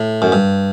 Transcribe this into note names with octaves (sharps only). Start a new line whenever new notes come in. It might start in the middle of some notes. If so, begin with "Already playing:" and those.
Already playing: A2
F#2
G2